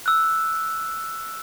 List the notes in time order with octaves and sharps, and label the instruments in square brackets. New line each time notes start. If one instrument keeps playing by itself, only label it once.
[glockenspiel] E6 F#6